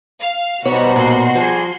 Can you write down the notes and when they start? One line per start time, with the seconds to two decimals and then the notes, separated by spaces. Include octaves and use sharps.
0.20 F5
0.65 B2 G3 B3 D#4 F#4 C5 C#5
0.96 A#2 F#4 C6
1.35 F3 G3 G#4 G#5